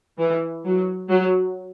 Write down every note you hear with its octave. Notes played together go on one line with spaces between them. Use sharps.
E3
F#3
F#3